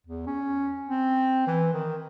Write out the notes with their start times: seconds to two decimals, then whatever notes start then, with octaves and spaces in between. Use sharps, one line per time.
0.07 E2
0.27 C#4
0.89 C4
1.47 E3
1.73 D#3